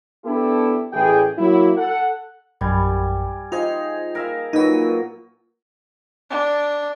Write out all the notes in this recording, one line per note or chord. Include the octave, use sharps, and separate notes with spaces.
B3 D4 E4 G4 A4
A1 E3 G#4 G5
F#3 A#3 E4
A4 F#5
A#1 F#2 G3 G#5
D#4 F4 G#4 C5
A#4 E5 F5
A#2 F#3 D#4 B4
D4